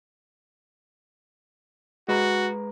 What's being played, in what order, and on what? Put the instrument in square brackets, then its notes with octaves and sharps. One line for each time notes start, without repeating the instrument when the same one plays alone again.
[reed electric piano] G#3 B4 A#5 [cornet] F#4